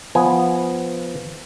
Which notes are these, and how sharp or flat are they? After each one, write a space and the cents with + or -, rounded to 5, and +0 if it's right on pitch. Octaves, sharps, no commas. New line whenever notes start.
F3 +0 B3 +0 G#5 +0